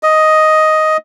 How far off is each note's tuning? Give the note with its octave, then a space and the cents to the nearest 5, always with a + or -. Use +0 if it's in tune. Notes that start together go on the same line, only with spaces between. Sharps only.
D#5 +5